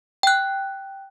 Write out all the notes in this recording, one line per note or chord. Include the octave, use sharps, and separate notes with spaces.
G5 F#6